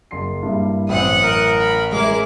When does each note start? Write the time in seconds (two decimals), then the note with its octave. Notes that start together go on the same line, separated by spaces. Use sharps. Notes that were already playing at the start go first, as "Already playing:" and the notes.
0.11 F#1 C6 C7
0.43 G2 A#3 E4
0.89 A1 F#2 C4 E4 F#5 D#6
1.23 A#4
1.60 B5
1.92 G#3 E4 G#4 A#4 D6